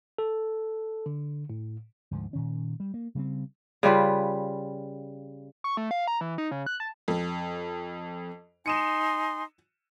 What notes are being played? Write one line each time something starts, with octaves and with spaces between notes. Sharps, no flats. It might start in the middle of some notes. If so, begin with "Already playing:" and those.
A4
D3
A2
D2 G#2 D3 F3
A#2 D#3 C#4
G3
A#3
C#3 G3 G#3 C4
C#3 G3 F4 B4
C#6
A3
F5
A#5
E3
D#4
C#3
F#6
A5
F2
D#4 G#5 C6 C#7 D#7 E7